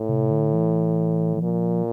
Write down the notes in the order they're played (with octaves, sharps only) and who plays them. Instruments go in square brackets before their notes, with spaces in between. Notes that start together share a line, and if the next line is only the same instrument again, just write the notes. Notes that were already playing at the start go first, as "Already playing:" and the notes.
Already playing: [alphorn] A2
[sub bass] C3
D3
E3
E3
[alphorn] A#2 [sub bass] F3